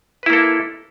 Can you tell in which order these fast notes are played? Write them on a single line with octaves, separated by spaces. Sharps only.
B4 E4 A#3 A4